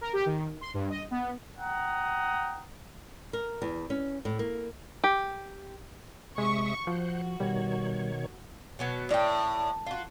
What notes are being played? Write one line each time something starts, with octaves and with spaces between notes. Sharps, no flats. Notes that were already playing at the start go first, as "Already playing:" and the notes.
A#4
G4
D#3
C6
G2
D#5
B3
F#5 G5 A#5 D#6
A#4
E2
C#4
A2
A#3
G4
C3 G#3 E5 C#6 D#6
F3 F#4 C5 F#5
B2 D#3 G3 C#5
B2 F#3 B3
A2 D5 G5
F4 F#4